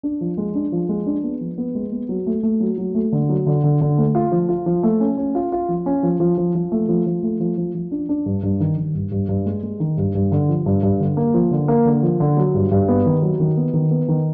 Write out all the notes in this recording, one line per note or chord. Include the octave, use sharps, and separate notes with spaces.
D4
F3
G#3
D4
F3
G#3
D4
B3
F3
B3
G#3
B3
F#3
A3
A3
F#3
F#3
A3
D3
F#3
D3
D3
D3
A3
F4
F3
F4
F3
A3
C#4
C#4
F4
F4
F3
C#4
F3
F3
F3
F3
A3
F3
F3
A3
F3
F3
F3
D4
D4
G2
G2
D#3
D#3
G2
G2
G2
G#3
G#3
D#3
G2
G2
D3
F3
G2
G2
D3
A#3
F3
D3
A#3
D3
F3
D3
F#3
G2
G2
B3
D#3
F#3
D#3
B3
D#3
B3
D#3